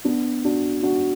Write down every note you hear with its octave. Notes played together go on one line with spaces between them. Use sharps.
B3 D4
D4 F#4
D4 F#4